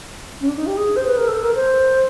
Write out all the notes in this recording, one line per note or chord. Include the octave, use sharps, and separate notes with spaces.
C#4
D4
D#4
G4
G#4
C5
B4
A#4
A4
A#4
C5